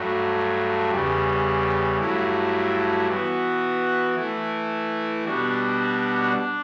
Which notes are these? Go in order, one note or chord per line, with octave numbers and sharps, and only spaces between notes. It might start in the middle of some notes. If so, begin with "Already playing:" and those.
Already playing: G2 F#3 A3
E2 C#3 G3
G2 F#3 A3 E4
E3 B3 F#4
E3 A3 E4
B2 G3 D4 F#4
D4